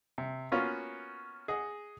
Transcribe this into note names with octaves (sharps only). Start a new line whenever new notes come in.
C3
A#3 B3 C#4 F4 F#4 F5
G#4 D#5 F#5